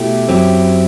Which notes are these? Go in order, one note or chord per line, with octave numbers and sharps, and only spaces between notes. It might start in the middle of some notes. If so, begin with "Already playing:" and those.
Already playing: B2 A3 E4 G4
F#2 F#3 C4 E4 G4